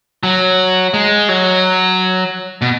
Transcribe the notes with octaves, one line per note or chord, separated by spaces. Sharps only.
F#3
G#3
F#3
B2